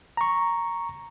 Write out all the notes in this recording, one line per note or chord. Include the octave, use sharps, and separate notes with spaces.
A#5 C#6